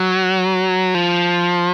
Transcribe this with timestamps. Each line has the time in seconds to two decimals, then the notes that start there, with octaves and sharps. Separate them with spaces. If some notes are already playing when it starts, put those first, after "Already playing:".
Already playing: F#3
0.95 F3